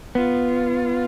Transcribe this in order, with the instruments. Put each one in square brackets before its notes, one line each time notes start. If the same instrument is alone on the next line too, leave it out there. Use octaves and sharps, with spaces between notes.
[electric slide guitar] B3 [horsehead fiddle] F4